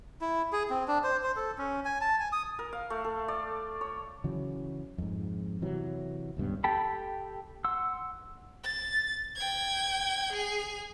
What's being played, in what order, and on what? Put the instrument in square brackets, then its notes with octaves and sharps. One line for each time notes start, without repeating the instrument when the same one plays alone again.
[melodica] E4
G#4
C4
D4
C5
C5
A4
C#4
G#5
A5
G#5
D#6
[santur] A#4
F5
A3
A4
D5
C#5
[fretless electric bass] C#3 E3 F#3
F2 G#2
C3 E3 F#3
D#1 C#2 G2 B3
[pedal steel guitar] G4 A4 G5 A5 B5
F#5 C6 E6
[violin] A6
G5 G#6
G#4 G#5